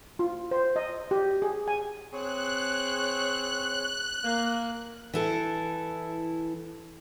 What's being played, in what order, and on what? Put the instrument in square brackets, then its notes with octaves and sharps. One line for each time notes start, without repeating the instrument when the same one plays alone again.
[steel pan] F4
C5
D#5
G4
G#4
G#5
[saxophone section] C4 G#4 C#5 [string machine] F#6
[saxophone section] A#3
[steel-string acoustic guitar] E3 E4 A4